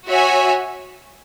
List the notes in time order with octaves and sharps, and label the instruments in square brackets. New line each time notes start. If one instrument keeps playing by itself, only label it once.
[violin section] F#4 C#5 E5 G#5